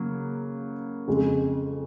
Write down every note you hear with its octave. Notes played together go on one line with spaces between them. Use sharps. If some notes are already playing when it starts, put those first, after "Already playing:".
Already playing: C#3 F#3 A#3
F2 C#3 G#3